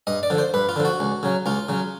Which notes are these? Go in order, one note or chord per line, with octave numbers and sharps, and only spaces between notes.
G2 D#5
D5
D3 F3
C5
G2 B4
F4
D3 F3
F#4
C#2
C#3 F#3
C#2 F4
C#3 F#3